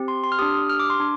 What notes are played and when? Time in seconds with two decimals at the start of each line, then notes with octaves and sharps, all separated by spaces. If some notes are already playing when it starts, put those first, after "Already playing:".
Already playing: C4 G4
0.08 C6
0.24 C6
0.32 F6
0.39 D4 G4 D#6
0.54 D#6
0.69 F6
0.80 D6
0.90 C6
1.00 D4